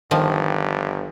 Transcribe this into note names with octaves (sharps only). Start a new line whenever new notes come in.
G1 D#3 F3